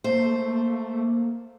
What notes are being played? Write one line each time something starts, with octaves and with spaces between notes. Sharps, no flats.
A3 A#3 C5